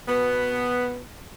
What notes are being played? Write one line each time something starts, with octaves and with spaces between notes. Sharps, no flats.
B2 B3